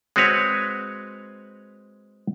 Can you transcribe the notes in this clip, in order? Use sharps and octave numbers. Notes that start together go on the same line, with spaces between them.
G#3 C4 F#4 B4 C#5